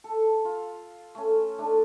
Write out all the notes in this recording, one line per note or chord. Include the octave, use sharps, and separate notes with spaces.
A4
F4
A3 C#4
A3 D4